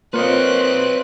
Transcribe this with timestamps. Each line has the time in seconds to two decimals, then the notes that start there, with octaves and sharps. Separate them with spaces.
0.14 A#3 C4 F4 B4 C#5 D#5 F#6